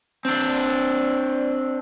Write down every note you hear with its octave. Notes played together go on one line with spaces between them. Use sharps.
C4 D4